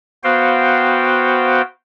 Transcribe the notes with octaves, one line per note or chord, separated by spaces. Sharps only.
B3 F#4 C5 F5 G5